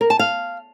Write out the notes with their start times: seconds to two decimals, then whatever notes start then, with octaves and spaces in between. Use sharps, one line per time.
0.01 A#4
0.10 A5
0.19 F5